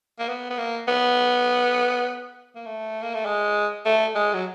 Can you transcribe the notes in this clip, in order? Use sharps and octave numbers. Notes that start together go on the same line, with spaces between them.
A#3
B3
B3
A#3
B3
A#3
A3
A#3
A3
G#3
A3
G#3
F#3